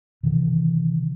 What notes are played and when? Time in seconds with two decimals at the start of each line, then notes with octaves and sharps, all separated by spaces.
0.23 C3 D#3 E3